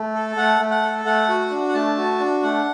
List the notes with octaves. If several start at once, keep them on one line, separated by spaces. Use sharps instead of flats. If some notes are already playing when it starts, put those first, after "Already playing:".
Already playing: A3
A4
A3 F#5
A3
F#5
A4
A3 F#5
F#4
D4
F#5
A3 A5
F#4
D4
A3 F#5